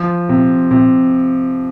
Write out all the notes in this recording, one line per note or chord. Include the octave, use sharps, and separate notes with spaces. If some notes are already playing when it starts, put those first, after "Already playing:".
Already playing: F3
C3
C3